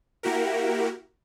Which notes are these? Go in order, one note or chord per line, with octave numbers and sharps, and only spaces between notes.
A#3 E4 F#4 G4 A#4